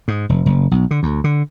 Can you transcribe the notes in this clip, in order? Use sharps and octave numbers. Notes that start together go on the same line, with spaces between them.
G#2
F1
F#1
B1
D3
D2
D3